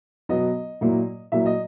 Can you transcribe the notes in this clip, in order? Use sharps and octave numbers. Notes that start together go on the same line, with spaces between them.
B2 F#3 B3 D#5
A#2 F#3 A#3 E4
A#2 F#3 A#3 E4 E5
D#5